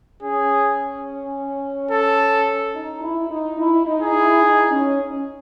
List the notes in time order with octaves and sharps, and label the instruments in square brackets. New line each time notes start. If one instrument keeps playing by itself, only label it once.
[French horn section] C#4 [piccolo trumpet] G#4
[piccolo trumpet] A4
[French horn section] D#4
E4
D#4
E4
D#4
[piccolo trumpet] G#4
[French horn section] E4
D#4
C#4